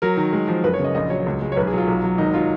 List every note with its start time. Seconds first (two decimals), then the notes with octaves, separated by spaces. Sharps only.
0.02 F#3 A#4
0.17 D#3
0.33 G#3
0.48 F3
0.64 F#1 B4
0.74 C#5
0.79 C#3 D#5
0.95 A#1 D#5
1.10 F#3 C#5
1.26 C#2
1.42 G#3
1.52 C#5
1.57 B1 B4
1.67 G#4
1.73 F#3 F4
1.88 B1
2.04 F#3
2.18 G#1 D#4
2.34 F#3 F4